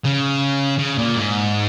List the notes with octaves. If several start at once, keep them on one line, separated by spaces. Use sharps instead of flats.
C#3
C#3
A#2
G#2